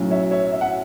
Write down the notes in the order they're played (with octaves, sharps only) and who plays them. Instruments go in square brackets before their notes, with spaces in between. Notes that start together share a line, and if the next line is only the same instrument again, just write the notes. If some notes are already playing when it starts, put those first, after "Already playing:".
Already playing: [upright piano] B1 A2 F#3 C#4
C#5 E5
C#5 E5
E5
F#5